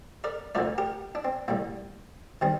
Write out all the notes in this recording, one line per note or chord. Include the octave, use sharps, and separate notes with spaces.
A#4 D5
D2 D3 F3 A3 A#4 D5
G4 A#4
D4
C4
A2 G3 A#3
D#3 G3 C4